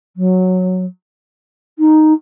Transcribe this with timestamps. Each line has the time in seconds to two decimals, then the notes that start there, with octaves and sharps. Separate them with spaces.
0.16 F#3
1.79 D#4